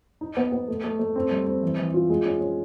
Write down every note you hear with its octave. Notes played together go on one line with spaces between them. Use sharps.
D#4
B3
B3
A3
A3
A3
C4
G3
C4
E3
E3
F4
G#3
C#4
C#4